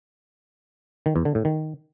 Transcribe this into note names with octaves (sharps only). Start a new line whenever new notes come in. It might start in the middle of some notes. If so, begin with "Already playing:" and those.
D#3
E2
D3
A2
D#3